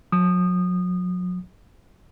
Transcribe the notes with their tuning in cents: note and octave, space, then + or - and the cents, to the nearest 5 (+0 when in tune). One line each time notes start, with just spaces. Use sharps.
F#3 -40 D#6 -20